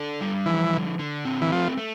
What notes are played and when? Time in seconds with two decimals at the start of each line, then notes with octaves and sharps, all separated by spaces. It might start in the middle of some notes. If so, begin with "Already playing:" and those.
Already playing: D4 A4
0.21 G3
0.46 E3 F3
0.73 D3
0.99 D3
1.25 C4
1.42 E3
1.52 F3 A3
1.77 A3